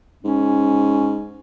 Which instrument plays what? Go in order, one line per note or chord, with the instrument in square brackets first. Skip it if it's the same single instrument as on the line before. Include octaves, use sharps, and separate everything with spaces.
[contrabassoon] G#2 [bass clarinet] C#4